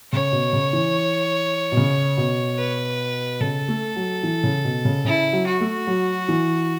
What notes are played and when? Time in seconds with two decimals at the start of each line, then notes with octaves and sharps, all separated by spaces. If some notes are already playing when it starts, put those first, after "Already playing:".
0.12 C#3 C#5
0.32 B2
0.53 C#3
0.73 E3
1.72 B2
1.77 C#3
2.17 B2
2.58 B4
3.40 C#3 A4
3.68 A3
3.96 F#3
4.23 E3
4.43 C#3
4.64 B2
4.85 C#3
5.05 C#3 E4
5.33 F#3
5.46 F#4
5.61 A3
5.87 F#3
6.28 E3